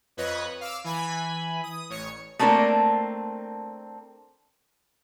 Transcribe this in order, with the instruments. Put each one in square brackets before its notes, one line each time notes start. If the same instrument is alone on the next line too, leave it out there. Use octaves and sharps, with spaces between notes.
[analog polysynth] F2 B4 C#5 D#5 F#6
F5 D6 E6
E3 G#5 B5
D#6
A1 C#5 C#7
[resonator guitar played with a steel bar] A3 A#3 C4 D4 A#4